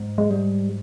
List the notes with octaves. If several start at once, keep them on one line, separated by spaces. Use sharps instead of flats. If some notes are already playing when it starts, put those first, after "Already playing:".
Already playing: G#2
G#3
G#2 G3